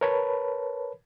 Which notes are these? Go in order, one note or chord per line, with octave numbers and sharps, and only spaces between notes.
A#4 B4 C#5 A5 B5